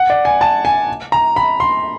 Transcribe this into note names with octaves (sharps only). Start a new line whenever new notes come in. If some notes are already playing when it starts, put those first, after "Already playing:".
Already playing: F#5
D5
G#5
A5
G#5
A#5
B5
C6